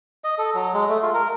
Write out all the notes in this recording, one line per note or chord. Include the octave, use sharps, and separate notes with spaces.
D#5
A4
F#3
G#3
A3
F4
A#4